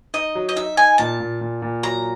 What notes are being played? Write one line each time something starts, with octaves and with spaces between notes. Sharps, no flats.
D#4 D#5
F#3
D#5
D#4 E5
D#4 G#5
A#2 A5
A#2
A#2
A#2
F#3 A#5